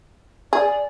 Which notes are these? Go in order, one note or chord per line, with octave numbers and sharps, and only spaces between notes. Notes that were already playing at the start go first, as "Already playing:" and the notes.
G#4 D5